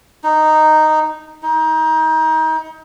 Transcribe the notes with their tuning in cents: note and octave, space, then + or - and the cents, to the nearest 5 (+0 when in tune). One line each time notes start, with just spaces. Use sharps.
D#4 -5
D#4 +25